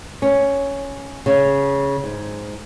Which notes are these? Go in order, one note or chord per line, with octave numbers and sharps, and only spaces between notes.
C#4
C#3
G#2